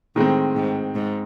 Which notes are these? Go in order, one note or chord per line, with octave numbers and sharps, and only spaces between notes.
A2 D#3 G#3 C4
G#2
G#2